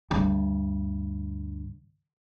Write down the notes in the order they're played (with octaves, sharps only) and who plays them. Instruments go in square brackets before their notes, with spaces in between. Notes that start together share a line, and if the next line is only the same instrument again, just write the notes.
[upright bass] D2 G2